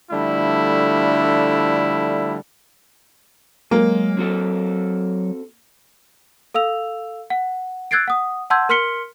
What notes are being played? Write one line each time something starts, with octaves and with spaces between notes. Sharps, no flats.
D3 F3 G3 A3 E4
F#3 G#3 A#3
C4 F#4 A4
A4 F5 E6 F7
F#5
E6 F#6 G#6 A6 C7 D7
F#5 D#6
F#5 A5 C6 E6 G6 G#6
A#4 C6 F6 B6 C#7 G7